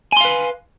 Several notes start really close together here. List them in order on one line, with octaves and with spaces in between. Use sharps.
G#5 C6 F5 B4